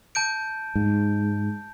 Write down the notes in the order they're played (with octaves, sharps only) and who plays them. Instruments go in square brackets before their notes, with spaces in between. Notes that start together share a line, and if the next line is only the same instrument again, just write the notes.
[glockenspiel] A5 G6 D7
[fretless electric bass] G#2